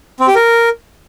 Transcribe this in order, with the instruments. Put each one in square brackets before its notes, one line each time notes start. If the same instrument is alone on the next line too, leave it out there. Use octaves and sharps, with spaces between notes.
[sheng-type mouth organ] C4
G4
A#4